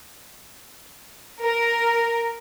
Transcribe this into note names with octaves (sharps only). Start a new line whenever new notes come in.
A#4